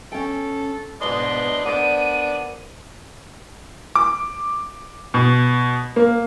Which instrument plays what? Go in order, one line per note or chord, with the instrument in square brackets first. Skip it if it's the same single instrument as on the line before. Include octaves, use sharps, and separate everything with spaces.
[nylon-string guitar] C#4 G5 [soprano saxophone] A4
[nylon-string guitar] E2 G#2 B2 [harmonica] D4 B4 D#5 [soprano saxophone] C6 [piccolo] G7
[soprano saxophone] B3 [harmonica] D4 [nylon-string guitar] A#4 C5 D5 [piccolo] D#7
[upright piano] D6
B2
A#3